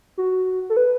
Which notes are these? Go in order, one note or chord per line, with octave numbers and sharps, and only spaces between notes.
F#4
A4
B4